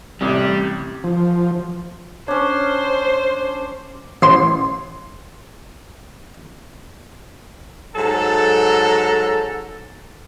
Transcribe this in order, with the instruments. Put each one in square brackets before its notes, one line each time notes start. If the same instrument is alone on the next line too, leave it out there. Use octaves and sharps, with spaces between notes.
[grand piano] A1 C3 [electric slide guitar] G3
[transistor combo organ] F3
[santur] C#4 D4 [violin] C5 [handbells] C#5
[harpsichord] A1 C6
[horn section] G#2 F#3 A4